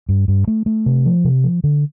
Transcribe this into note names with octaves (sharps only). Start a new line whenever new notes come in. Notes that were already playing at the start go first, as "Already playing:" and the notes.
G2
G2
A3
A3
C3
F3
C3
F3
D3